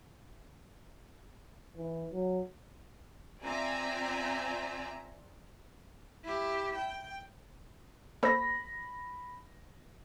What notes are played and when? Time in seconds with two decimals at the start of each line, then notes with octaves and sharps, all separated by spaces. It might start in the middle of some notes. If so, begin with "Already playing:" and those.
1.77 E3
2.13 F#3
3.43 C4 F4 D5 E5 G#5 A#5
6.24 E4 G4
6.76 G5
8.23 A#3 A4 C5 B5 A#6